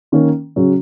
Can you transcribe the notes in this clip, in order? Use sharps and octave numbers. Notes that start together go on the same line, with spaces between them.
D#3 A#3 C#4
C#3 F#3 C#4